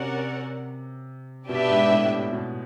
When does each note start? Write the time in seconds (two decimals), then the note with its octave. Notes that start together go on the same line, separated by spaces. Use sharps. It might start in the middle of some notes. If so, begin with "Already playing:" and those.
Already playing: C3 C#4 F#4 A#4 D5 F#5
1.49 B2 D4 G4 B4 E5
1.70 G#2
1.91 A2
2.33 B2